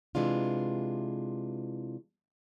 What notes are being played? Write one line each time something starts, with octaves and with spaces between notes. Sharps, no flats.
C3 E3 G#3 D4 F4